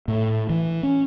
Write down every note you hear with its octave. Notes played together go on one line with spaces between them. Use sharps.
A2
E3
C#4